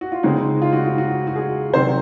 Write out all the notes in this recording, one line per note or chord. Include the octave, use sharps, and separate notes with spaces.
F#4
F4
C#3 G#3 C4 D#4
F4
F#4
F4
F#4
F#4
G#4
C3 D#3 F#3 C4 C5